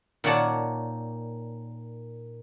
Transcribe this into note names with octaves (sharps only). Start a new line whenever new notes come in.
A#2 D#3 C#5 D5 F#5 A5